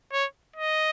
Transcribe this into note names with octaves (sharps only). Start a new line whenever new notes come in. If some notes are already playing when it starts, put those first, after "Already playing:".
C#5
D#5